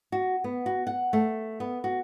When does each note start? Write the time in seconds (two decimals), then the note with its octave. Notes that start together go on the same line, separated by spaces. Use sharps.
0.12 F#4
0.44 B3
0.66 F#4
0.87 F#5
1.13 A3
1.60 B3
1.84 F#4